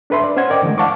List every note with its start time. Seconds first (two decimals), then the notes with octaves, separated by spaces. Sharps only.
0.10 D4 A4 B4 E5 C6
0.24 D5
0.37 C#4 C5 F#5 G#6
0.50 A#4 D5 D#5 G5 D6
0.63 D3 E3 G#3 A3
0.78 F5 F#5 A5 C#6 D6